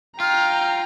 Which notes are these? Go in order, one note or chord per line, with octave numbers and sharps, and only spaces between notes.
F4 G5 A#5 F6